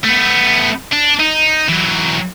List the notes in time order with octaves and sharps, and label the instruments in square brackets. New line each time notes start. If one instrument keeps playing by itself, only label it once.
[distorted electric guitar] A3 B3
D4
D#4
E3 F#3